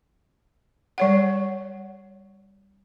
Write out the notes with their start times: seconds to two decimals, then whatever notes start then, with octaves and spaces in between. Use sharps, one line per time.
0.98 G3 C#5 F#5